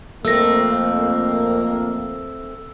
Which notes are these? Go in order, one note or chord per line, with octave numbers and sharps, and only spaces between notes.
F2 A3 A#3 C4 E6 A#6